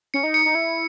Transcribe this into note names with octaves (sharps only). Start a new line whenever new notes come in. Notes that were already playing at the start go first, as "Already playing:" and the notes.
C#4 C#7
D#4
C#7
D#4
E4